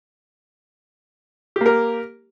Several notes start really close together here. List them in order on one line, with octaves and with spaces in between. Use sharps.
G4 A#3 A#4